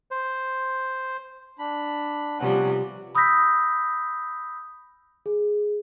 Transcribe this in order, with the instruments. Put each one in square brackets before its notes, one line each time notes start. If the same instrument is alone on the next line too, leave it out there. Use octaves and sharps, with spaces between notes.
[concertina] C5
[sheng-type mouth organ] D4 B5
[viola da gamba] C3 F3 G3 [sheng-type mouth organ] B3 C#4 F#6
[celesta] B5 D#6 E6 G6 A#6 B6
G#4